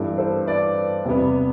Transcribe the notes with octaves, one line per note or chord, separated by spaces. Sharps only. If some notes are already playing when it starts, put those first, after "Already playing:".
Already playing: G2 E3 B3 A4
A4 C5
B4 D5
E2 C3 G3 B3